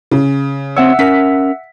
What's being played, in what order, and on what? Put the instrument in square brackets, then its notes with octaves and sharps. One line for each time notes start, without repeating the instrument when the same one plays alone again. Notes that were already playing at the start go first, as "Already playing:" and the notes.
[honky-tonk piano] C#3
[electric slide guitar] C4 C5 C#5 [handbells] E5 F#5 E6
[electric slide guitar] C#4 A#4 [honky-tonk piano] B6